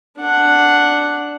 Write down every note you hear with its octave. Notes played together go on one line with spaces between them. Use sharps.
D4 F#5